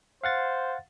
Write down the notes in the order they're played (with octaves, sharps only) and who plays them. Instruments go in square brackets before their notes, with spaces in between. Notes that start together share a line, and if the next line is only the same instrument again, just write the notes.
[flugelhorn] C5 [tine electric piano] F5 F#5 A6